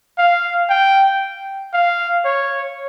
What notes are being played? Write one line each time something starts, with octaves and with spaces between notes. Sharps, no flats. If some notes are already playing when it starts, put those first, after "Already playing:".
F5
G5
F5
C#5